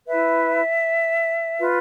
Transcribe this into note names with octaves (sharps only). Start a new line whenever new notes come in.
E4 B4 E5
F4 B4